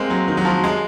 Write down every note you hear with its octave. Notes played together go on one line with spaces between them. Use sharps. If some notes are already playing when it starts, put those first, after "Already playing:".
Already playing: G#3 A#3 C4
F#3
D#3
F#3
F3
G#3